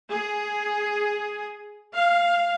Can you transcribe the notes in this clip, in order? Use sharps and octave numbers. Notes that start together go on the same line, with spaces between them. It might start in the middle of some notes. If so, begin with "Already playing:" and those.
G#4
F5